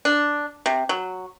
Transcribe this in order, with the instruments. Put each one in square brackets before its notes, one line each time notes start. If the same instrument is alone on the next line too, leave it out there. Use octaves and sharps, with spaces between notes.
[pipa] D4
C3
F#3